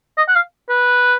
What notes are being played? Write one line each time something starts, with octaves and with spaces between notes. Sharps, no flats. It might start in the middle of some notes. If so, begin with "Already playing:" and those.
D#5
F#5
F5
B4